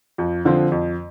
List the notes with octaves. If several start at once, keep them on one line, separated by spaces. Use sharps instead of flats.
F2
D3 F3 C4
F2